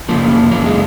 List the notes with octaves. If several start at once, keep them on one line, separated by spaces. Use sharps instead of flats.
F#2 C#3 F3 A#3
F#2 C#3 F#3 A#3
G#3